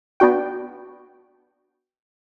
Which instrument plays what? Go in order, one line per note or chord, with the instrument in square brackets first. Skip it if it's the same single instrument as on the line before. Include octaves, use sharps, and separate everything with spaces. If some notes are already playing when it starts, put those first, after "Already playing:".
[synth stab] B3 D4 F#4 G5